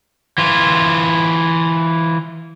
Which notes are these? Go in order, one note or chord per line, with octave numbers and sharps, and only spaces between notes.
E3 F4